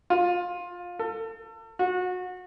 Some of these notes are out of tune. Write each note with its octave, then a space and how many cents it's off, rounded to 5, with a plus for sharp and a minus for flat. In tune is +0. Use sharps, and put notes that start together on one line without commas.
F4 +20
A4 +35
F#4 -25